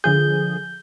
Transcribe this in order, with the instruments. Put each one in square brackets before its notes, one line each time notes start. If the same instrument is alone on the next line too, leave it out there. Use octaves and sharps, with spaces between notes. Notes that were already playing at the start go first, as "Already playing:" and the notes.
[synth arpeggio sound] D3 F3 G#4 [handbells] G6